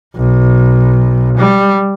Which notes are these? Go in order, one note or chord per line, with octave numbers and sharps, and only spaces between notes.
B1
G3